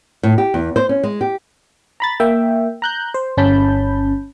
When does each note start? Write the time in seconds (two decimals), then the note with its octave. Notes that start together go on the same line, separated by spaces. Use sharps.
0.23 A2
0.38 G4
0.54 E2
0.76 C5
0.89 C#4
1.04 G#3
1.21 G4
2.00 A#5 B5 A6
2.20 A#3 E5 G5
2.82 A#5 F#6 G6
3.14 C5
3.37 G1 C#4 A5 B5 G6